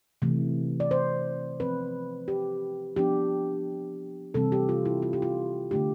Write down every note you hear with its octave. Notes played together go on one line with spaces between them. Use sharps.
C3 E3 A3
D5
C5
F3 C4 B4
G4
F3 B3 D4 G4
C3 E3 G3 C4 A4
G4
F4
E4
F4
G4
F4
D3 A3 D4 G4